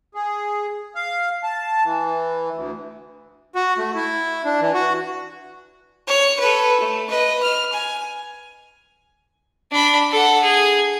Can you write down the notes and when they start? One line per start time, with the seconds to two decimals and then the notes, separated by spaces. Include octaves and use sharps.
0.14 G#4
0.95 F5
1.43 A5
1.84 E3
2.55 D2
3.55 F#4
3.78 A3
3.95 E4
4.45 D4
4.61 E3
4.74 F#4
6.07 C#5
6.40 A4 B4
6.81 A3
7.10 B4 D#5
7.43 F6
7.73 G#5
9.71 D4 B5
10.11 A4 F#5
10.42 G#4